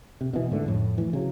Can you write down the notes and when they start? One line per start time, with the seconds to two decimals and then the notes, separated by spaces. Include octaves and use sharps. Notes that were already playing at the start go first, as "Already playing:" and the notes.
0.21 C3
0.33 B2 E3
0.51 G#2 D3 A3
0.66 F2 A2
0.98 E3
1.13 C#3 F#3